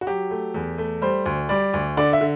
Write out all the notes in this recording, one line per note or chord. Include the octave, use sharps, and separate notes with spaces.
F#4
F#3 G4
A3
E2
A3
G3 C5
D2
G3 D5
D2
D3 D5
E5
D3